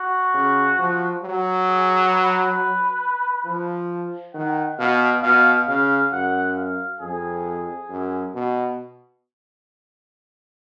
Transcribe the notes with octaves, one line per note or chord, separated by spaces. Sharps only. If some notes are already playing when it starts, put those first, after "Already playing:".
Already playing: F#4
C#3
F3
F#3
G#4
B4
F3
D#3 F#5
B2 F5
B2 F5
C#3 F5
F#2 F#5
F5
F2 G#4
F#2
B2